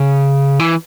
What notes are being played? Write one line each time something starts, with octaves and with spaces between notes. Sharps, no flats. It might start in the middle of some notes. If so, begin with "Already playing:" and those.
Already playing: C#3
E3